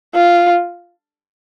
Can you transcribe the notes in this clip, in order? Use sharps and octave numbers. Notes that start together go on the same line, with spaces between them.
F4